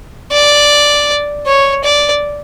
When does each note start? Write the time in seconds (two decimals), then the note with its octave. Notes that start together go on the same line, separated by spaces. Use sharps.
0.32 D5
1.46 C#5
1.84 D5